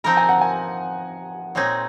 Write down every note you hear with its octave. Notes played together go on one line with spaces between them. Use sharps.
F3 C4 D#4 A#4 A#5
G#5
F#5
G#5
A#2 G#3 C4 D#4 G#4 C#5